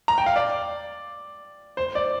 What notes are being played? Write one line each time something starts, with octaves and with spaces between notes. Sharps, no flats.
A#5
G5
F5
D5
C5
D5